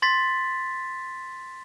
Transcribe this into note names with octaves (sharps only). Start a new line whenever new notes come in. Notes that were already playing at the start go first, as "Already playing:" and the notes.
C6 A6 B6